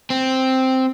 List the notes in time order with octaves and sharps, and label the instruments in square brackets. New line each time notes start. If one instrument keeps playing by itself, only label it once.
[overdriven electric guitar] C4